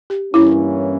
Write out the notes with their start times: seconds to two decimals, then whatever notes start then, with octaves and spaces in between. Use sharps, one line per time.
0.10 G4
0.33 G2 E3 A#3 C#4 E4